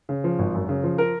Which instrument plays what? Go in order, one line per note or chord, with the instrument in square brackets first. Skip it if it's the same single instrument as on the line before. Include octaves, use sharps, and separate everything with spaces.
[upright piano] C#3
F3
G#1
F#2
C#3
F3
A#4